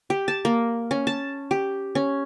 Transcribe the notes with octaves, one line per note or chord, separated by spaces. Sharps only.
G4
A5
A#3
C#4
A5
G4
C#4